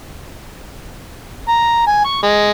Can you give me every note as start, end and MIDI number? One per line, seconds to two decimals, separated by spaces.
1.48 1.86 82
1.87 2.00 80
2.05 2.19 85
2.22 2.51 56